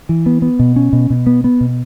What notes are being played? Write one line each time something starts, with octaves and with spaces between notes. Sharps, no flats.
E3
B3
B3
B2
C#4
B2
B2
B3
B3
B2